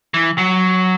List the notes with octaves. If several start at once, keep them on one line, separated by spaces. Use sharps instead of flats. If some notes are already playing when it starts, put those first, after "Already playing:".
E3
F#3